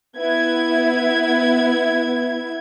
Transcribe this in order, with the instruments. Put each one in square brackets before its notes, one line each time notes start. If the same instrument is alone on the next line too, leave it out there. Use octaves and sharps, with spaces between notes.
[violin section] B3 E4 G#6